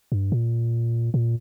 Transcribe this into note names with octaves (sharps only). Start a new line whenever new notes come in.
G2
A#2
A#2